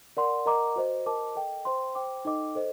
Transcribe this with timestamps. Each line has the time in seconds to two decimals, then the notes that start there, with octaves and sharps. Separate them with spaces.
0.17 A#4 D5 F#5 C6
0.46 A#4 D#5 F#5 A#5 D6
0.76 F#4 C5 D#5
1.06 A#4 D#5 A5 D6
1.36 A4 D#5 G5
1.65 C5 G5 C6
1.95 C5 G5 D6
2.25 D#4 A4 D#5 G5 D6
2.55 A4 C5 D#5